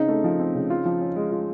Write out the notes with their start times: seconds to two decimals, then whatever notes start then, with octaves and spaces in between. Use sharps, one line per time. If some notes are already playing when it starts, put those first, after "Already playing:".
Already playing: C#3 C4 D#4
0.08 A3
0.24 F3
0.39 C4
0.55 C#3
0.70 F4
0.85 F3
1.01 C#4
1.16 G#3
1.32 F4